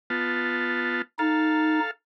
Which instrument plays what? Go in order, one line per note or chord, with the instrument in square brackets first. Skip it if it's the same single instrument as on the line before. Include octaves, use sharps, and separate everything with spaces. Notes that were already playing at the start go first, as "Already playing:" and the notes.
[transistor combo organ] B3 F4 A5
[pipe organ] D#4 [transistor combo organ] A4 F5